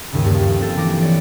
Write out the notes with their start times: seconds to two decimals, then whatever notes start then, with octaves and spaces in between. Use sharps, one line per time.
0.12 D#2 G#2 C#3
0.24 G1 G2 A#3 A4
0.46 F3
0.60 C4 F4 A4
0.76 E3 D6 A#6
1.01 C#5 D5